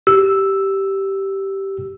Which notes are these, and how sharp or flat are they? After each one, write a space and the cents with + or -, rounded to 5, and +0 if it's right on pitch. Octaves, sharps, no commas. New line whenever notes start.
G4 -10 E6 +0